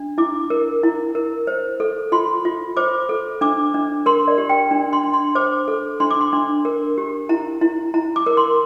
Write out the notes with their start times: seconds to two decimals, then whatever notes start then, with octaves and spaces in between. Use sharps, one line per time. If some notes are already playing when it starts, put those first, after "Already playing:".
Already playing: D4
0.18 E4 D6
0.50 A#4
0.84 E4
1.15 A#4
1.47 C5
1.80 A4
2.12 F4 C6
2.45 F4
2.77 C5 D6
3.09 A4
3.41 D4 D6
3.74 D4
4.06 A#4 C6
4.28 D5
4.38 G4
4.49 G5
4.71 D4
4.93 C6
5.03 D4
5.13 C6
5.35 C5 D6
5.68 A4
6.00 D4 C6
6.10 D6
6.21 C6
6.33 D4
6.65 A#4
6.98 G4
7.29 E4 A#5
7.61 E4
7.94 E4 A#5
8.16 D6
8.27 A#4
8.37 C6